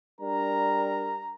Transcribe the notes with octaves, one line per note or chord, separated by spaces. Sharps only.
G3 D4 A#4 A#5